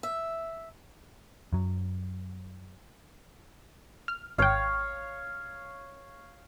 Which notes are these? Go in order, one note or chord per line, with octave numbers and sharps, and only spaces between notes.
E5
F#2 F#3
F6
G#1 C#5 F5 G5